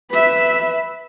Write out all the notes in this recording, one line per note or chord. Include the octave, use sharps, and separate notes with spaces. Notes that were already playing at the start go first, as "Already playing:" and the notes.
B4 E5